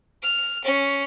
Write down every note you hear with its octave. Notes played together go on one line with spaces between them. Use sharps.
F6
C#4